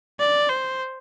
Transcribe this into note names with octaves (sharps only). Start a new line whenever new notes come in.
D5
C5